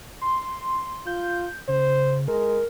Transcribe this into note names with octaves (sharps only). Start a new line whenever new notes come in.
C6
F4 G6
C#3 C5
G#3 A#4